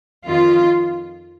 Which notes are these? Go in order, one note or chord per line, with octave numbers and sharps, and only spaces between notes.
F2 D#3 F4